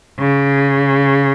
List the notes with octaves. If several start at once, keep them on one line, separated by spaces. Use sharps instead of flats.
C#3